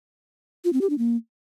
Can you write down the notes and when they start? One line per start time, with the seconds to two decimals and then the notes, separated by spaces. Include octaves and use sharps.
0.65 F4
0.73 C4
0.81 G4
0.90 D4
0.98 A#3